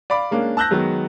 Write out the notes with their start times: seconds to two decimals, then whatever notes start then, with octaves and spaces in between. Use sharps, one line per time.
0.10 D5 F5 B5 D6
0.31 G#3 A#3 C#4 D4
0.57 A5 E6 F#6 G6 A#6
0.71 D#3 F#3 G#3 B3